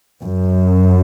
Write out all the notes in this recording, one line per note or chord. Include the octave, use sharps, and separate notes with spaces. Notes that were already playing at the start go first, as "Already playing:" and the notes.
F#2